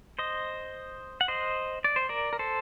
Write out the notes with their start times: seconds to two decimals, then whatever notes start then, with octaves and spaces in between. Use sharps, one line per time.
0.19 C5 D#5
1.21 F#5
1.28 C5 D#5
1.84 D5
1.96 C5
2.09 A#4 D5
2.33 A#4
2.39 A4 C5